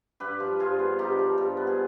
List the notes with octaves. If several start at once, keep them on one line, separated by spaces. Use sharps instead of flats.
G2 G4 B4
F3
G2 F4 G#4
B3
G2 D#4 G4
F3
G2
B3
G#4